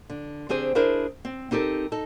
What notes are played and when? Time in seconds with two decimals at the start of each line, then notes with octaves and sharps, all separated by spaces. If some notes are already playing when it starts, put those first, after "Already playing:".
0.10 D3
0.49 D3 C4 G4 G#4 C5 G#5
0.75 D4 E4 G#4 A#4 C5
1.25 C4
1.51 C4 D#4 G4 A4 A#4
1.92 D#4 A4